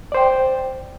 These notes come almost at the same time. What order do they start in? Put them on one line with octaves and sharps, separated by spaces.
D5 C5 G5